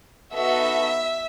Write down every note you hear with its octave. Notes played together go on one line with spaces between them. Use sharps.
B3 D#4 F#4 A4 E5